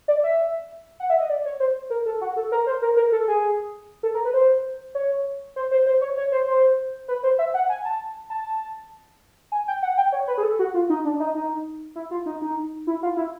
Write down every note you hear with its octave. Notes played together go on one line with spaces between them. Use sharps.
D5
E5
F#5
E5
D#5
D5
C#5
C5
A#4
A4
F#4
A4
A#4
C5
A#4
A#4
A4
G#4
A4
A#4
B4
C5
C#5
C5
C5
C5
C#5
C#5
C5
C5
B4
C5
E5
F#5
G#5
A5
A5
G#5
G5
F#5
G5
C#5
B4
G#4
A4
F#4
F4
D#4
D4
D#4
D#4
E4
F4
D#4
D#4
E4
F4
E4